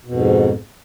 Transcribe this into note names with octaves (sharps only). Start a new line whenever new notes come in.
F2 G#2 B2